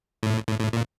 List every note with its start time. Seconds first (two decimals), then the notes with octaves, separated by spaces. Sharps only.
0.23 A2
0.48 A2
0.60 A2
0.73 A#2